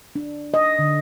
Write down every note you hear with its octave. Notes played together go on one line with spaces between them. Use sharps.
D4
D#5
D3